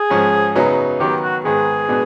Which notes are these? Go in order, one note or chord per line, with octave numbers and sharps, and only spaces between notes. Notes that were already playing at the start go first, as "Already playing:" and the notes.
Already playing: G#4
G#2 F3 G#3 C#4
F#2 C#3 F#3 B3 D#4
D#3 F#3 B3 G4
F#4
G#2 D#3 G#3 B3 G#4
B2 G#3 B3 D4